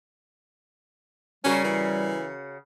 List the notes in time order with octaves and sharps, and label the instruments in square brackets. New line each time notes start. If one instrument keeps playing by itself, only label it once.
[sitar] C#3 F#4 A#4 [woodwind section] G3 [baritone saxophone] C#4
[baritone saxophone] E3